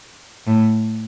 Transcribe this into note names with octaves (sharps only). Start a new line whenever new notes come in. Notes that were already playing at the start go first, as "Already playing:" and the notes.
A2